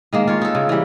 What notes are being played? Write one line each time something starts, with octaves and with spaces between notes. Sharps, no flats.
D#3 G#3 A#3
F4 C#5
D#4 A4
C#3
E3 G3